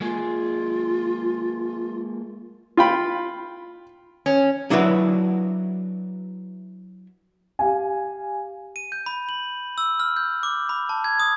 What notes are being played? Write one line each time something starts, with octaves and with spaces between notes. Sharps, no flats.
G#3 A#3 F4 G#4
F4 G5 B5
C#4
F#3 D4 E4 F#4 B4
G4 F5 G#5
D#7
G6
B5
F#7
E6
F6
G6
D6
B5
A5
G#6
D#6